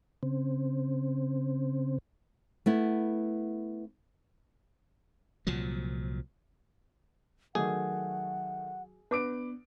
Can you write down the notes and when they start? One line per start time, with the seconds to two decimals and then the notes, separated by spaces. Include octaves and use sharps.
0.23 C#3 C4
2.66 A3 B3 E4
5.47 C2 A#2 F3 F#3
7.55 D#3 F#3 A3 G#4 F#5
9.11 B3 D4 B4 D6 D7